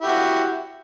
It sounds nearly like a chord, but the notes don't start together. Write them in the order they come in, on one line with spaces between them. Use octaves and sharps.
E4 G4 F#4